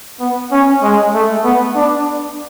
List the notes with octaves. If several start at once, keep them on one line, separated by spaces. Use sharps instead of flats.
B3
C#4
G#3
A3
B3
D4